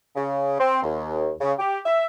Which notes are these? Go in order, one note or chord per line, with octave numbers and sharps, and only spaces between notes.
C#3
C4
D#2
C#3
G4
E5